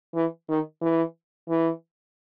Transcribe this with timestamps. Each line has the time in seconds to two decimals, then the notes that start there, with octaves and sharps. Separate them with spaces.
0.15 E3
0.49 D#3
0.82 E3
1.49 E3